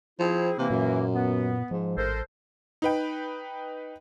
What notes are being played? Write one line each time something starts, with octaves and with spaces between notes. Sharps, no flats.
F3 C4 E4 G#4
C3 E3 A#3
F#2 A#2
B3
G#2 F3
A1 A4 A#4 C5
D#4 B4 G5